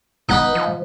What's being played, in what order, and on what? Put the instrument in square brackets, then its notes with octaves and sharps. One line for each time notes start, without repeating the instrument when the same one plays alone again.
[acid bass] B3 [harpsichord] D#4 F#5 B5
[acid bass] F3